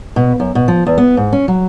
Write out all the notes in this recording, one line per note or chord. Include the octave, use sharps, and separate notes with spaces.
B2
F#2
B2
F3
E2
B3
G#2
C#4
F#3